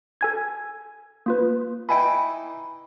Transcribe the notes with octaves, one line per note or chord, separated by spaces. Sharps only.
A4 G#5 G#6
A#3 F4 B4
E3 D#4 E4 G5 G#5 B5